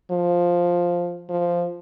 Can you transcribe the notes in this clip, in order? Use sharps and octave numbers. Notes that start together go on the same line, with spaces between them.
F3
F3